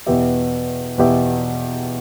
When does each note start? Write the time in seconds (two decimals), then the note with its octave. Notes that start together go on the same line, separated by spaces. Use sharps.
0.06 E2 B2 B3 G4 E5
0.98 E2 B2 B3 G4 E5